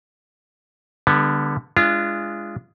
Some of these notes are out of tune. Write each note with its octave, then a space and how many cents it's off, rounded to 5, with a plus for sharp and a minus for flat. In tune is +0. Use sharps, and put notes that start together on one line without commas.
D3 +0 G3 +35 B3 -10
G#3 +0 D4 +0 F4 -30